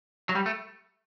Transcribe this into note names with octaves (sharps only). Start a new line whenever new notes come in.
F#3
G3
A3